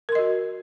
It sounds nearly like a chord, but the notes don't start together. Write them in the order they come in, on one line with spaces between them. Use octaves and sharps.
A#4 C6 D#5 F#4